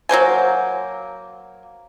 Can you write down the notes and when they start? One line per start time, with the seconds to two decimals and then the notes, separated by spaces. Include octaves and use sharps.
0.09 F#3 A#3 C5 G#5